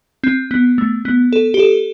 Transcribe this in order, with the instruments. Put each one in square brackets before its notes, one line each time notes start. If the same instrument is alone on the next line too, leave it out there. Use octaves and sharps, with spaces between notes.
[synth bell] C4
B3
A3
B3
A4
G4
A4